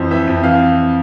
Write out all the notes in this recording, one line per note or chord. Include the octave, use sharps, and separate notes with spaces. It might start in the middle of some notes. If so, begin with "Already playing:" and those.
Already playing: F2 E3 C5
E3 E5
F2
E3 F5